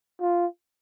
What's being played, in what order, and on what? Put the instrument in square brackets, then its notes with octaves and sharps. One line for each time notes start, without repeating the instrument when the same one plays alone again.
[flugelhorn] F4